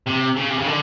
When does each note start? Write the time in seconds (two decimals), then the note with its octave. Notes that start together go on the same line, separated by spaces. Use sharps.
0.07 C3
0.36 C#3
0.50 C3
0.58 C#3
0.66 D3